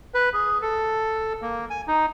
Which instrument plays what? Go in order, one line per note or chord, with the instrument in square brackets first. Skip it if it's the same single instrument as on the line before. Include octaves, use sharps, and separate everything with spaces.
[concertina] B4
G#4
A4
A#3
G#5
D#4